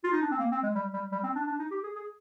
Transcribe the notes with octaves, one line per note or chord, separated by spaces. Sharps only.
F4
D#4
D4
C4
A#3
C4
G#3
G3
G3
G3
C4
D4
D4
D#4
G4
G#4
G#4